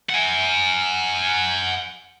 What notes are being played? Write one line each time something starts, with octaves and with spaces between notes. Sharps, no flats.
F#5 G#5